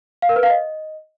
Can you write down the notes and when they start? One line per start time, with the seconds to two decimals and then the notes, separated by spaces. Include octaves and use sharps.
0.22 F5
0.29 A#4
0.36 B4
0.43 F5
0.50 D#5